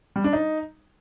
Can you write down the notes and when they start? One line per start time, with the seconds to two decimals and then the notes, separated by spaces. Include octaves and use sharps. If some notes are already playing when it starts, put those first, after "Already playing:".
0.16 G3
0.24 D4
0.33 D#4